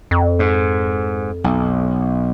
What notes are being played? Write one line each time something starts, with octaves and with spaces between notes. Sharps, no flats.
F2
G#2
B1